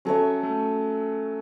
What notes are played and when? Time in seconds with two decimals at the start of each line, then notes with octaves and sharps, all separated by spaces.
0.05 F#3 C#4 A4 C#5 E5
0.43 A3